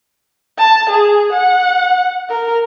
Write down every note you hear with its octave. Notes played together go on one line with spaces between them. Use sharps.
A5
G#4
F#5
A#4